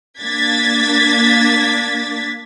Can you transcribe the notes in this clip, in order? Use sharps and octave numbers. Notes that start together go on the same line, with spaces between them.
A#3 D4 G#6 A6 B6